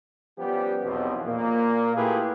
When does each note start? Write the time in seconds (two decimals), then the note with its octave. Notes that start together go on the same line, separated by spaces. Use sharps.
0.39 F3 G3 B3 C#4 G4
0.84 B1 E2 B2 F3 C4 C5
1.25 A#2 A#3
1.95 A3 E4 F4 G4 G#4 B4